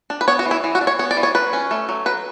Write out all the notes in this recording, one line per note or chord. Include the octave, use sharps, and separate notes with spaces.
D4
B4
B3 C#5
F#4
E3
E4
E3
F#4
D4
C#5
B3 C#5
D5
E3
C#5
F#3 B4
C#4
A3
F#3
F#3 B4